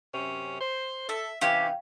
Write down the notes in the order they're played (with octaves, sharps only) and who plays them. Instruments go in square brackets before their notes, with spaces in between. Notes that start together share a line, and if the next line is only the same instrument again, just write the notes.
[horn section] F#2 C3 C#4
C5
[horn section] A4 [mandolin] E5
[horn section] C3 E3 [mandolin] C#4 G4 D6 [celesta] F5 G5